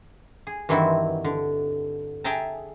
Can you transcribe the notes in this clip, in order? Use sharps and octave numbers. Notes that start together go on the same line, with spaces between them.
G#4
G2 D#3 E3 C4 E4 F#4
D3
G#4 E5 G5 A5 A#5